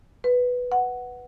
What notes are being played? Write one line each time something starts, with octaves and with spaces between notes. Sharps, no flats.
B4
F#5